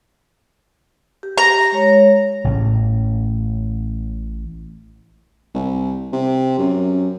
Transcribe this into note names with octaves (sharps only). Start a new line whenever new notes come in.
G4
A#5
G#3 C#5
A1 A2 C#3
C2
C3
F#2